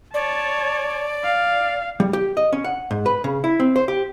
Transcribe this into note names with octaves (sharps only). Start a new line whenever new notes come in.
C#5 D5 A5
F5
G3
G4
D#5
C#4
F#5
G#2
B4
C#3
E4
C4
C5
G4